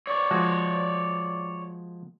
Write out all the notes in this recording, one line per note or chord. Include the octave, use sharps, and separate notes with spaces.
C#5 D5
F3 G#3 F#4